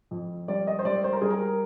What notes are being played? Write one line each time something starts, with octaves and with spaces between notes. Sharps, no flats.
F2
G3 D5
D#5
C5
G3 D5
C5
A#4
G3 G#4
A#4